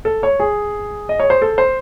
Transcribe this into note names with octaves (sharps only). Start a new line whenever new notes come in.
A4
C#5
G#4
D#5
C#5
C5
A4
C5